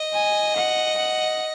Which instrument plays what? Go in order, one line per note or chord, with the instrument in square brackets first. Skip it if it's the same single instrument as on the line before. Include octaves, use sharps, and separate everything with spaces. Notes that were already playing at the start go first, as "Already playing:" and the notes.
Already playing: [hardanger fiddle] D#5
[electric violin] G#5
F#5
F#5